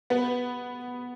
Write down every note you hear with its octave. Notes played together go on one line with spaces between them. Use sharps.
B3 B4